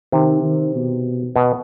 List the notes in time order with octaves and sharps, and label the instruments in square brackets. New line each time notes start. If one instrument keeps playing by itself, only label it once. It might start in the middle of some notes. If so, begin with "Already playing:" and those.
[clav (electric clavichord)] C3 [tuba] D#3
[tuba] D#3
B2
[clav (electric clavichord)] B2